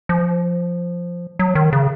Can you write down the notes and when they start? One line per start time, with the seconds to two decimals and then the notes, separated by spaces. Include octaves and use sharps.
0.09 F3
1.39 F#3
1.55 D#3
1.73 C#3